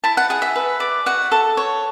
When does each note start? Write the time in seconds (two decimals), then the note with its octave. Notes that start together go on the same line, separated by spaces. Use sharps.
0.04 E4 A5
0.17 F#5
0.30 G#4 F#5
0.42 E5
0.56 B4
0.80 D5
1.06 F#4 F#5
1.32 A4
1.57 C#5